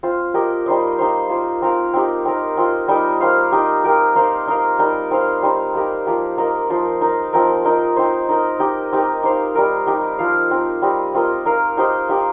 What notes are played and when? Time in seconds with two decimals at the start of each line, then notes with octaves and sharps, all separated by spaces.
0.03 C4 F4 C5
0.34 A#3 G4 A#4 D#5
0.66 G3 D#4 C5 D#5
0.98 D#4 G4 C5 F5
1.30 A#3 F4 C5
1.62 C4 D#4 A#4 F5
1.94 C4 D#4 G4
2.25 C4 D#4 A#4 D#5
2.57 C4 F4 D#5
2.88 G3 D#4 A#4 D#5
3.20 A#3 G4 C5 F5
3.52 D#4 G4 D#5
3.84 A#3 G4 A#4
4.15 A#3 D#4 C5 F5
4.48 D#4 A#4 F5
4.79 G3 A#3 D#4 A#4
5.11 C4 D#4 C5 F5
5.43 G3 C4 D#4 C5
5.74 A#3 D#4 G4 A#4
6.06 F3 A#3 G4
6.38 A#3 D#4 A#4 D#5
6.70 F3 D#4 C5
7.01 D#4 A#4 D#5
7.33 F3 C4 D#4 A#4
7.65 D#4 A#4 D#5
7.96 C4 D#4 C5
8.29 D#4 A#4 D#5
8.59 D#4 G4 D#5
8.92 C4 D#4 G4 A#4
9.23 D#4 C5 F5
9.55 G3 D#4 A#4
9.87 D#4 G4 D#5
10.19 F3 D#4 C5 F5
10.51 C4 D#4 A#4
10.82 G3 C4 G4 D#5
11.14 C4 F4 A#4 D#5
11.45 D#4 A#4 F5
11.77 D#4 G4 C5 D#5
12.09 A#3 D#4 G4